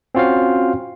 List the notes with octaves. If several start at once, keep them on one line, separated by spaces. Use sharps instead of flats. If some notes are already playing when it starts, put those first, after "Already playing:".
C4 C#4 F4 F#4 C5 F5